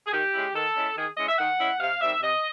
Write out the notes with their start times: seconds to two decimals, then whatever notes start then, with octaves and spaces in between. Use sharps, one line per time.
0.07 G#4
0.13 D#3 G4
0.34 G#3 C#4 E4
0.55 D#3 A4
0.76 G#3 C#4 E4
0.96 D#3 G#4
1.17 G#3 C#4 E4 D#5
1.29 E5
1.39 D#3 F#5
1.59 G#3 C#4 E4
1.80 C3 F5
2.01 D#3 G3 C4 E5
2.22 C3 D#5